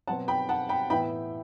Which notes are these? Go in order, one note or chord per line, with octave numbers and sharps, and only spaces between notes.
B2 F#3 C4 F#5 A5
G5 B5
F#5 A5
G5 B5
A2 E3 B3 E4 G5 B5